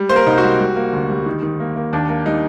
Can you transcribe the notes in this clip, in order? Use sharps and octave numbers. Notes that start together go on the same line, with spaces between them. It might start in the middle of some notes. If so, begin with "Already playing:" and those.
Already playing: G3
A#3 C5
A#4
C2 D#4
F#4
G3
G3
A#3
D2
G3
D#3
D#3
A#3
A#3
D#2 D4
A#3
G3 D#4